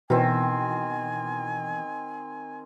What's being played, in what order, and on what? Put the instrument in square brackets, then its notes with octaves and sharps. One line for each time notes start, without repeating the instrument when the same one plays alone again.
[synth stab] B2 E3 [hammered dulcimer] D#3 C4 [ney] G#5